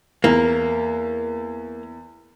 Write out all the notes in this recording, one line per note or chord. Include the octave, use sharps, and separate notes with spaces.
E2 A#3